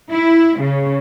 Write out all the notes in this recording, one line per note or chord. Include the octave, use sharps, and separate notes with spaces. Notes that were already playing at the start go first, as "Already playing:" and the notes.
E4
C#3